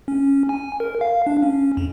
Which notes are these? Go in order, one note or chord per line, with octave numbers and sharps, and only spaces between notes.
C#4
G#5
A#4
F5
D4
C#4
F2